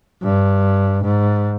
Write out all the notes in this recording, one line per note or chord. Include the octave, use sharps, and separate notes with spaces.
G2
G#2